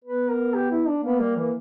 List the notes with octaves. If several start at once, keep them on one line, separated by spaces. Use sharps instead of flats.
B3 B4
A#4
G4
E4
D4
A#3 B3
G3 A#3
E3 A#3